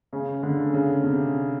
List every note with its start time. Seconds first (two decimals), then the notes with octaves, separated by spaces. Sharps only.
0.13 C#3
0.43 D3
0.74 C#3
1.03 C3